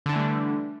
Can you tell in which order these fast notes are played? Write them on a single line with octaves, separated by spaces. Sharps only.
D3 D4 E3 A3 G3